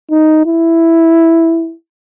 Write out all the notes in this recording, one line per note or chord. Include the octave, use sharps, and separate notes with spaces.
D#4
E4